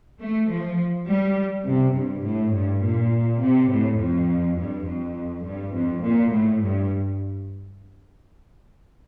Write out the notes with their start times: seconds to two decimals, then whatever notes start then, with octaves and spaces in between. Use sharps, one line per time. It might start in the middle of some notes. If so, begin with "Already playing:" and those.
0.20 A3
0.49 F3
1.07 G3
1.66 C3
1.95 G2
2.24 A2
2.53 G2
2.82 A#2
3.41 C3
3.70 A2
3.99 F2
4.57 G2
4.86 F2
5.44 G2
5.74 F2
6.02 A#2
6.32 A2
6.61 G2